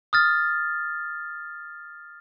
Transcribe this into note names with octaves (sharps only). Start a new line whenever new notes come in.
D#6 F6 A6